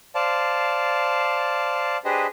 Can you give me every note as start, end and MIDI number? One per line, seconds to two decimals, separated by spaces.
0.15 1.97 72
0.15 1.97 74
0.15 1.97 77
0.15 1.97 81
2.05 2.27 62
2.05 2.27 67
2.05 2.27 68
2.05 2.27 71
2.05 2.27 72
2.05 2.27 75